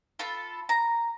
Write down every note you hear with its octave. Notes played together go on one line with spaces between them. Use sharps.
F4 A4 B5
A#5